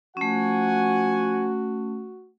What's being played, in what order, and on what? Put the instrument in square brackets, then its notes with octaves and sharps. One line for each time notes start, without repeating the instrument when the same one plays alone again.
[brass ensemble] F3 F#5 G#5 [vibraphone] A3 C#4 [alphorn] F#4